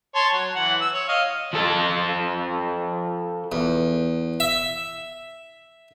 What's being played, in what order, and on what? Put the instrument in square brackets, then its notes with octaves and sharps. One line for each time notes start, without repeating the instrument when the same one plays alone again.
[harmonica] C#5 A5 C6
F#3
E3 F#5
E6
C#5
D#5 F5
[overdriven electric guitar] F3 A4
[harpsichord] E2
E5